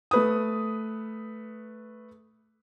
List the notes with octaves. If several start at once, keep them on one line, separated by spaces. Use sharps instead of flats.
A3 B4 D#6